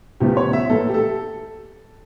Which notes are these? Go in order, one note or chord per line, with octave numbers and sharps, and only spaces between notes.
E2 C#3 F3 A3 G4
C#5
E5
A2 E3 A#3 A4
G4
A4